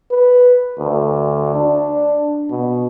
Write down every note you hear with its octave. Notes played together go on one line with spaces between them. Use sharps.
B4
D2
D4
B2